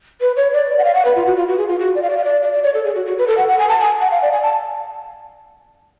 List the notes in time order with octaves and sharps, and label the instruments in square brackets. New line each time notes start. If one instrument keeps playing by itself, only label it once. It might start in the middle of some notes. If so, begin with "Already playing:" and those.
[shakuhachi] B4
C#5
D5
F#5
F5
F#5
B4
F4
F#4
F4
F#4
G#4
F4
F#4
D5
F5
D5
F5
D5
D5
D5
C#5
A4
G#4
F#4
F#4
B4
A4
F#5
F#5
G#5
A5
G#5
F#5
F5
D5
G#5
A5